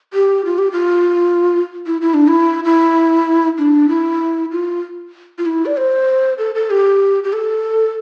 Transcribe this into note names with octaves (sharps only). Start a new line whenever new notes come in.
G4
F4
G4
F4
E4
E4
D4
E4
E4
D4
E4
F4
F4
E4
D5
C5
A4
A4
G4
G4
A4